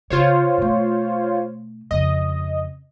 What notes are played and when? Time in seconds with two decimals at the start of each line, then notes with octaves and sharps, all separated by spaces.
0.10 C#3 F4 C5 C#5
0.58 B2 A3
1.91 F2 C#3 D#5